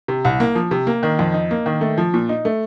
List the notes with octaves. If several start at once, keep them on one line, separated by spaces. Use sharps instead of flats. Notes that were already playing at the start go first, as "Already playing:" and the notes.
C3
C2
A#3
F3
C3
A#3
D#3
F2
D#4
A#3
D#3
A3
F3
A#2
D#4
A3